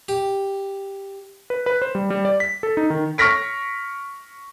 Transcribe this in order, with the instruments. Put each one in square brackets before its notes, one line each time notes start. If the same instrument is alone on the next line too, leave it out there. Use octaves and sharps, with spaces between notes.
[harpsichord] G4
[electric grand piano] B4
B4
C5
G3
G3
D5
B6
A4
D#4
D#3
[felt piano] C#6 F6 A#6 B6 D7